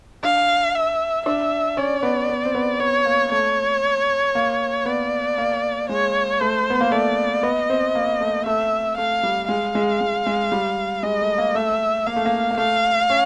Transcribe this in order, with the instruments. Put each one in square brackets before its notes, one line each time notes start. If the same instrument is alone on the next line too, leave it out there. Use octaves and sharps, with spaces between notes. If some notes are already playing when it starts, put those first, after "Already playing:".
[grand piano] D4 [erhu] F5
[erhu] E5
[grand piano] D4 [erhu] E5
[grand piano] C#4 [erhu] D5
[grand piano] B3
B3
C4
B3
[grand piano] B3 [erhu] C#5
[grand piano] A#3
[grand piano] A3 [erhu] C#5
[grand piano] A#3
[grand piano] B3 [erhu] D5
[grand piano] A#3
[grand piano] G#3 [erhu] C#5
[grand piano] A3 [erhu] C5
[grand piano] B3
A#3
[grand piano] A3 [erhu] D5
[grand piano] B3 [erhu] D#5
[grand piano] C4
A#3
A3
[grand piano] A3 [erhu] E5
[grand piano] A3 [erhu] F5
[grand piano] G3
[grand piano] G#3 [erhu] F5
[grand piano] G#3
G#3
G#3
G3
[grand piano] G#3 [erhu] D#5
[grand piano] A3
A#3
[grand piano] A3 [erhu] E5
[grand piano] A#3 [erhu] F5
[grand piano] A3
A#3
A#3
[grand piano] A3 [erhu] F5
[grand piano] C#4